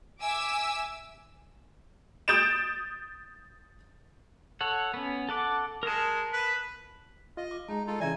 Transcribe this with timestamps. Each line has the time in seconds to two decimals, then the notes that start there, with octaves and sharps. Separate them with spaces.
0.22 E5 G#5 D6 E6
2.28 D#6 G6 A6 D7 E7
4.61 A4 C#5 F#5
4.94 B3 C#4
5.29 A4 F#5 D6
5.83 G#3 A#4 A5
6.32 B4
7.37 F4 D#5
7.51 D6
7.68 G#3 D#4 A5
7.87 D#4 F4 A4
8.00 C#3 E3 D5 E5 G#5 A#5